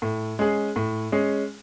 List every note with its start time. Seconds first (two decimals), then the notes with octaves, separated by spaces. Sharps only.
0.02 A2
0.39 G#3 C#4 G#4
0.76 A2
1.12 G#3 C#4 G#4